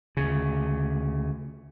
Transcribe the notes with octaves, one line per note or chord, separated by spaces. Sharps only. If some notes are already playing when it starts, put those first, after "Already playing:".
D2 C#3